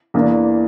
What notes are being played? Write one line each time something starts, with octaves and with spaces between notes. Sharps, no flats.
E2 E3 A#3 D4